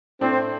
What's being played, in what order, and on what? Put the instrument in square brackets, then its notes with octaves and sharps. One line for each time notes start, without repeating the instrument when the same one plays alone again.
[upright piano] A2 A3 D4 [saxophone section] C4